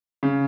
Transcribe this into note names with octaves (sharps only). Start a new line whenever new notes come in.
C#3